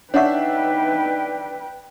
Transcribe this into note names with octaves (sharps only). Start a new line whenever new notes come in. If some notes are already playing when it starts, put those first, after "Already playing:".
D4 D#4 B4 C#5 E5 F#5 G5 C#6